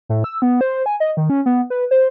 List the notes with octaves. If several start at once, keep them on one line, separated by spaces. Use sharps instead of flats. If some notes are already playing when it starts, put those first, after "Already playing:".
A2
E6
B3
C5
G#5
D#5
D#3
C#4
B3
B4
C5